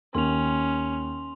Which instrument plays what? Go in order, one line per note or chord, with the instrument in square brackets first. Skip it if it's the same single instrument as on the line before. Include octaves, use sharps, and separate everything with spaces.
[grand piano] D#2 [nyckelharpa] C#4 [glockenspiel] C6 F7